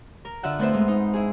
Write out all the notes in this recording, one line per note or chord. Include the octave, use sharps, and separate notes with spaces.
A#4
D3 F4 E5 F#5
A3 B3 C4 B4 C5 E5
G#2
D#4
E4 G#4